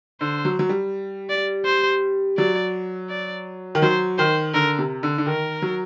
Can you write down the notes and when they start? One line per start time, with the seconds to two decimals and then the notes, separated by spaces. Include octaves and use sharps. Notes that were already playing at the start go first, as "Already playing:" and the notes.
0.21 D3 C5
0.45 F#3
0.59 F#3
0.69 G3
1.30 D5
1.65 C5
2.38 F#3 D5
3.10 D5
3.75 D#3
3.82 F#3 C5
4.18 D#3 C5
4.54 D3 A#4
4.79 C3
5.03 D3
5.18 D3
5.26 D#3 A#4
5.62 F#3